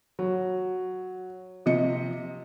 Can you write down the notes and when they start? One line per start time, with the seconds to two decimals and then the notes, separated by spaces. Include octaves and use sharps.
0.19 F#3
1.66 C3 F3 D#5 C#7